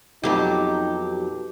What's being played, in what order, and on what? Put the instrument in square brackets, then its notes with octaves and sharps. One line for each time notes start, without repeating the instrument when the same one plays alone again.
[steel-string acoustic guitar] F2 B2 F#3 [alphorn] D#4 [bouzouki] G4